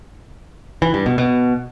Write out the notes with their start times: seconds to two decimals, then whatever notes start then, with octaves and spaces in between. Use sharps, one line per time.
0.82 E3
0.94 G2
1.06 B2
1.18 B2